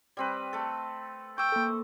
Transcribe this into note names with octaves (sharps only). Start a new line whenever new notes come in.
G3 C4 B4
A3 A4
G5 C#6 D6 E6
A#3 A4